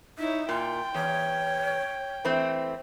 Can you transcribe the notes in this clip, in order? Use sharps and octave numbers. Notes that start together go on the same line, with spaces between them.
D#4 E4 C#5
A#2 G5 C6
E2 C#5
E3 A3 C4